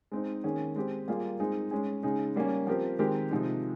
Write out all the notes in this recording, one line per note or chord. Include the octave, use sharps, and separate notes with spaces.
G#3 C4 D#4
D#3 A#3 C#4 G#4
G#3 C4 G4
G3 A#3 F4 G#4
G#3 C4 D#4 G#4
G#3 C#4 G#4
C#3 G#3 D#4 G#4
G3 A#3 C#4
F3 C4 G4 A#4
D#3 G#3 C4 G4 A#4
C3 F3 G#3 D#4